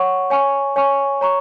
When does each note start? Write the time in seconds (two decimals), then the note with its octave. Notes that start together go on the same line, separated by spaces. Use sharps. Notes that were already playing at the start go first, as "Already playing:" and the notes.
Already playing: C#5 F#5 C#6
0.30 C#5 G#5 C#6
0.76 C#5 G#5 C#6
1.21 C#5 A#5 C#6